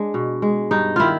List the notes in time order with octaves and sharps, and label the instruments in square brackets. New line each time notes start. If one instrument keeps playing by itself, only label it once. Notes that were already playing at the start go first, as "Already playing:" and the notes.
Already playing: [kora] G#3 D4
B2
G#3
G2 D#4
D#3 E4 F4